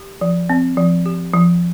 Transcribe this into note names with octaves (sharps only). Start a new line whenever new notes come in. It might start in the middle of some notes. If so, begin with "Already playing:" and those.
Already playing: G4
F3
C4
F3
G4
F3